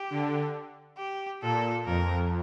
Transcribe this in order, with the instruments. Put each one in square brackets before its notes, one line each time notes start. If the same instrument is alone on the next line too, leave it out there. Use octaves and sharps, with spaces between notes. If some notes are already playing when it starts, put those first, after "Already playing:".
Already playing: [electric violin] G4
[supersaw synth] D3
[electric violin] G4
[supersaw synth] A#2 [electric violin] A4
[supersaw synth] F2 [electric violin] A#4